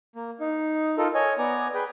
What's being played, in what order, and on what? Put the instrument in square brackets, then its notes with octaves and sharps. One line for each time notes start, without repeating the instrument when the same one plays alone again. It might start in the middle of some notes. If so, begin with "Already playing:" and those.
[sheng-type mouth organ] A#3
D#4
D#4 F4 A4 A#4
C#5 D#5 G#5
B3 D5 G#5 A#5
G#4 B4 G5